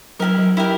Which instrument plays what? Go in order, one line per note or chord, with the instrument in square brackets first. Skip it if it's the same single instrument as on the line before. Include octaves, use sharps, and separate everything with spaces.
[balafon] F#3 [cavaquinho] E4 G4 A#4
[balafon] F#3
[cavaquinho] E4 G4 A#4